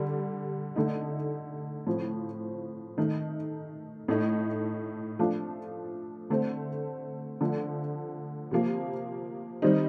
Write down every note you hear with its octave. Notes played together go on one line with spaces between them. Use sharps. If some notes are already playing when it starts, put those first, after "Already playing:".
Already playing: D3 G3
D3 A3 D#4
A2 F3 C4
D#3 A3 D#4
A2 A3 D#4
F3 A3 D4 F4
D3 A3 C4
D3 F3 A3
C3 F3 A#3
D#3 G3 C4 D#4